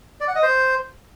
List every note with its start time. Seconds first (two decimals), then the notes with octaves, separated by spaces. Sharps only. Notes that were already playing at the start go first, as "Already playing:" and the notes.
0.20 D5
0.28 F#5
0.35 D#5
0.43 C5